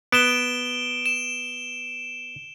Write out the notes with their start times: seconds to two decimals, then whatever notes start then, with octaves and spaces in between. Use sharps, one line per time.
0.12 B3 D7 E7 G7
1.06 E7